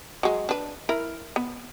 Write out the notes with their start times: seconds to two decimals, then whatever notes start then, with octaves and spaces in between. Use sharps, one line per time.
0.23 F#3 G#3
0.49 D4 B4
0.89 E4 A#4 B5
1.36 B3